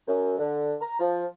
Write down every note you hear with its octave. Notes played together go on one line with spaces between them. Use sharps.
F#2
D3
A#5
F3